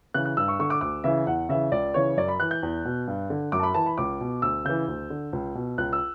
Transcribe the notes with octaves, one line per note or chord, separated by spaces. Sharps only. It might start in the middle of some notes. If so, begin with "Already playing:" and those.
C#3 E3 F#6
F#6
G2 E6
C#6
D3 C#6
D6
D2 D6
C#3 E3 E5
E2 F#5
C#3 E3 E5
C#2 D5
C#3 E3 C#5
F#2 D5
B5
E3 F#6
G6
E2
B2
G2
D3
F#2 D6
A5
B5
E3 A5
B5
C#2 D6
B2
D2 E6
C#3 E3 G6
D2
D3
C#2
B2
C#2 F#6
E6